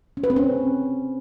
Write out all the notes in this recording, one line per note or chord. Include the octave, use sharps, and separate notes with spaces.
C#4
B4
C4
C#4